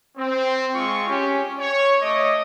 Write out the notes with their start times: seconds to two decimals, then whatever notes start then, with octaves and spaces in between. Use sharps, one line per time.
0.18 C4
0.74 G#3 F4 C#6
1.08 C#4 G4
1.60 C#5
2.02 A3 D#5 D6 D#6